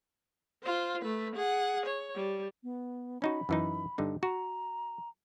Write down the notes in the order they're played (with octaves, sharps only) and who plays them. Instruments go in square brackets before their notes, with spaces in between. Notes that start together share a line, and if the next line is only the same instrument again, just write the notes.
[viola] F4 C5
A3 B4
G#4 F#5
C#5
G3
[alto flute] B3
[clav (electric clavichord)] C#4 D#4 F#4 [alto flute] B5
[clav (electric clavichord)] F#2 E3 D#4
G2 D3 D#4
[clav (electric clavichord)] F#4 [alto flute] A#5